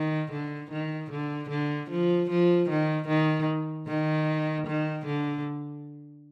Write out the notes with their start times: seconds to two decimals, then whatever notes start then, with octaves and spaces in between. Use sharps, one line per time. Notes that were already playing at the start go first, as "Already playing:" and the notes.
Already playing: D#3
0.31 D3
0.71 D#3
1.11 D3
1.50 D3
1.90 F3
2.30 F3
2.69 D#3
3.08 D#3
3.87 D#3
4.67 D#3
5.06 D3